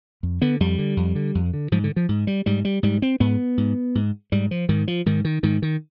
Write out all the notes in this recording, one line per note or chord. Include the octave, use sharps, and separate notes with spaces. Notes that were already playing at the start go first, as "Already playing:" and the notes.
F2
D3 B3
F2 G3
D3
F2
D3
F2
D3
G#2 F3
D3
F3
G#2
G3
G#2 G3
G3
G#2 G3
C4
G#2 B3
G#2
G#2
G#2 G3
F3
G#2 D#3
F3
G#2 D#3
D#3
G#2 D#3
D#3